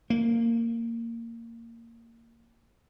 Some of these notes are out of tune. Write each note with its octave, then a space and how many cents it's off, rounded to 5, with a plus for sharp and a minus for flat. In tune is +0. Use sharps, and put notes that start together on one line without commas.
A#3 -15